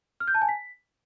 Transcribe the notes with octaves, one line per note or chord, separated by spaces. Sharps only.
F6
G6
A5
G#5
B6